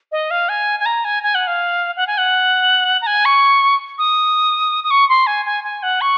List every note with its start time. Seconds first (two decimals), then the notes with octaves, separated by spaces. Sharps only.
0.12 D#5
0.31 F5
0.49 G#5
0.80 G#5
0.86 A#5
1.05 G#5
1.23 G#5
1.35 F#5
1.47 F5
1.97 F#5
2.07 G#5
2.18 F#5
3.01 A#5
3.07 G#5
3.25 C#6
3.98 D#6
4.84 D#6
4.91 C#6
5.09 C6
5.27 G#5
5.45 G#5
5.64 G#5
5.83 F#5
6.01 C#6